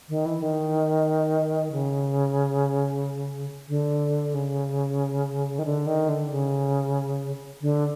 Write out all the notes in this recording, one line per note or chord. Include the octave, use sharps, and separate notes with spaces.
D#3
E3
D#3
C#3
D3
C#3
D#3
D3
D#3
D3
C#3
D3